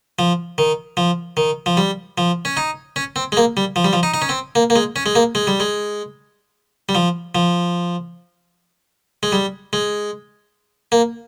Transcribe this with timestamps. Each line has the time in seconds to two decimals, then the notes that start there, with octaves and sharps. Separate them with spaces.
0.19 F3
0.58 D#3
0.97 F3
1.37 D#3
1.66 F3
1.77 G3
2.18 F3
2.45 C#4
2.57 D#4
2.96 C#4
3.16 C4
3.32 G#3
3.37 A#3
3.57 G3
3.76 F3
3.84 G3
3.93 F3
4.03 D#4
4.14 D#4
4.22 C#4
4.29 C4
4.55 A#3
4.70 A#3
4.76 G#3
4.96 C#4
5.06 G#3
5.15 A#3
5.35 G#3
5.47 G3
5.60 G#3
6.89 G3
6.95 F3
7.35 F3
9.23 G#3
9.32 G3
9.73 G#3
10.92 A#3